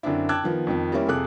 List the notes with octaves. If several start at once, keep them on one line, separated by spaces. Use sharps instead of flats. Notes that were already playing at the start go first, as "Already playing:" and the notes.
F#2 D3 C4 D4 E4
G5 A5 D6 E6 F#6 G#6
D#3 F3 B3
F2 D#3 F3
G3 A#3 C4 C#4 E4
F2 C3 G#4 A4 D6 F#6